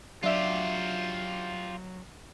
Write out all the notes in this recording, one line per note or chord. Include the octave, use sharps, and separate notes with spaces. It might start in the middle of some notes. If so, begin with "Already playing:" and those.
F#3 D4 F4 G4 E5